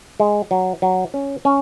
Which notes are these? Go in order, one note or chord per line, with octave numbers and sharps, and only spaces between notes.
G#3
F#3
F#3
C#4
C#4